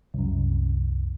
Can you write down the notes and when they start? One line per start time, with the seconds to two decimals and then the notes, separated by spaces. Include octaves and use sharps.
0.14 C2 F#2